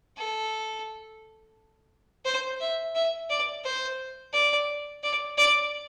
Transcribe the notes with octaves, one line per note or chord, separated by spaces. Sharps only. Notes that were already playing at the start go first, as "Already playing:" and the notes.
A4
C5
E5
E5
D5
C5
D5
D5
D5